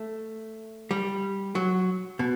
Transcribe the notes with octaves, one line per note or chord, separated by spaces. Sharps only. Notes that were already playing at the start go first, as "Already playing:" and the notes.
Already playing: A3
G3
F#3
B2